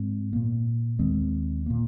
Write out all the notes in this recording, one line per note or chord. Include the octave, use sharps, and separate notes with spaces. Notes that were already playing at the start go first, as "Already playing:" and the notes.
Already playing: G#2 G#3 C4
A#2 A#3
D#2 D#3 G#3 C4
A#2 A#3